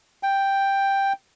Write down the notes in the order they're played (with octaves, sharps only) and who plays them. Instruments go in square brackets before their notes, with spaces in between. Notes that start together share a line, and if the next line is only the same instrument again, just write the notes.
[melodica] G5